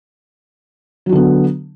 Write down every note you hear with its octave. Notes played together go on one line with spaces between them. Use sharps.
D3 F#3 B3 F#4